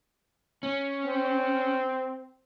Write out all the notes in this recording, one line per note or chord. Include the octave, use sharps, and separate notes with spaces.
C#4
C4